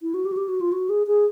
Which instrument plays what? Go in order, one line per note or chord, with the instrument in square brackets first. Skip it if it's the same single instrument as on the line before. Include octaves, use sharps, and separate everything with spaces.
[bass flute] E4
F#4
G4
F#4
G4
F#4
F4
F#4
G#4
G#4